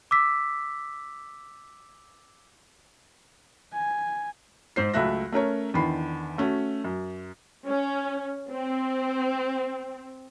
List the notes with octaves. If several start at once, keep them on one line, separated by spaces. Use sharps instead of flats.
D6 E6 B6
G#5
G#2 C5 C7
C#2 F#3 A3 E5 F#6 A#6
A3 C#4 A#4 C#5
E2 D3 D#3 B5 C7
A3 C#4 F#4
F#2
C#4
C4